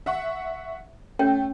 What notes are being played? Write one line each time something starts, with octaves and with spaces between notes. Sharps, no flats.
E5 F#5 C#6
A3 C#4 C#5 G5